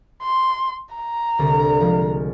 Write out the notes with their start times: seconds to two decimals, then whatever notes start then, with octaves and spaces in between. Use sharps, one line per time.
0.22 C6
0.95 A#5
1.39 C2 D3
1.80 F3 G#3 F4